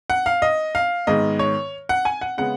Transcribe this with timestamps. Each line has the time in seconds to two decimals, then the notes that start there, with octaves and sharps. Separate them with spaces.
0.10 F#5
0.26 F5
0.42 D#5
0.75 F5
1.07 G#2 D#3 G#3 B3 D#5
1.39 C#5
1.89 F#5
2.05 G#5
2.21 F#5
2.38 C#3 G#3 B3 F#5